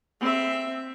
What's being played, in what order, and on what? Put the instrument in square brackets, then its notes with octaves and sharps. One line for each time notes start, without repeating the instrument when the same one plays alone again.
[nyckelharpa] C4 E5